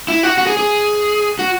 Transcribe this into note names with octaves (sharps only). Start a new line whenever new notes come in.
E4
F#4
F#4
G#4
G#4
F#4